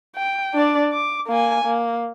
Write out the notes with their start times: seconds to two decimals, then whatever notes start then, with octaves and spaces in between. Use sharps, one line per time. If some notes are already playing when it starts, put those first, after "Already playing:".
0.16 G5
0.54 D4 D5
0.92 D6
1.27 A#3 G#5
1.64 A#3